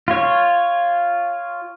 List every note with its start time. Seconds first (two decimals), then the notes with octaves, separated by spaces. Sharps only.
0.08 F4 C#5